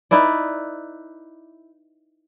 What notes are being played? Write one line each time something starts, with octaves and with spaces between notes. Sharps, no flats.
D#4 E4 B4 D5